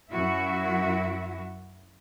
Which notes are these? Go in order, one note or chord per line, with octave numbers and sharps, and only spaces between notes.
F#2 E4 F#4 E5